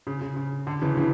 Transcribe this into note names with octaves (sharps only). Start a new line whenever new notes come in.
C#3
C#3
C#3
D3
C#3 E3
C#3 E3